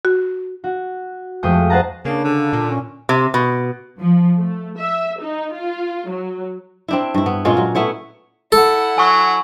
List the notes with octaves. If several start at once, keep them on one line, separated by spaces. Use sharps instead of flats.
F#4
F#4
F2 G#3 A3 G5 C#6 D#6
C5 D#5 F#5 A5 A#5
C#3 A#3 D4
D3
A#2
C#4
C3
B2
F3
A3
E5
D#4
F4
F#3
C4 D4 E4
G2 E4
B3
A#2 G#3 C#4 F4
F#3
A3 B3 E4 C#5
E4 A4 F#5
F#3 G#5 C#6